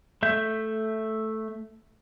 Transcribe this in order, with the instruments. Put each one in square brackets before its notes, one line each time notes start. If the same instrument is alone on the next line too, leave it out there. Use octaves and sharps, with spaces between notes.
[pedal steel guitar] A3 E5 G6